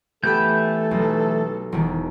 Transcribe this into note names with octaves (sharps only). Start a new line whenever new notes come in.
E3 A3 B3 G4 A4 B5 G6
B1
E1 D#3